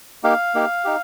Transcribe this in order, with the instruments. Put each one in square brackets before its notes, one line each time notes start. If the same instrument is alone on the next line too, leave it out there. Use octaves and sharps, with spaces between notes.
[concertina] A#3 D#4 G4 F5
A#3 D#4 G4
D#4 G4